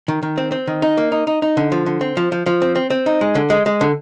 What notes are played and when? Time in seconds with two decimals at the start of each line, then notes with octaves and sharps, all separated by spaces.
0.08 D#3
0.23 D#3
0.38 C4
0.52 C4
0.67 D#3
0.82 D#4
0.97 A#3
1.12 D#4
1.27 D#4
1.42 D#4
1.57 D3
1.72 F3
1.86 D3
2.01 C4
2.17 F3
2.32 F3
2.46 F3
2.62 C4
2.76 C4
2.90 C4
3.06 D#4
3.21 G#3
3.35 D3
3.50 G#3
3.66 G#3
3.81 D3